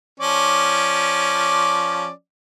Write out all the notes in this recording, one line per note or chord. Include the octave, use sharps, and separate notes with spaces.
F3 C#4 D5